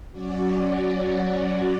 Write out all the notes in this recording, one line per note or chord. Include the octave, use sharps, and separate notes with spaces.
F#3 C#4 F#4 D5